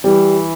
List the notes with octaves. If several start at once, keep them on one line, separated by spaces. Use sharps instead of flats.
E3 G3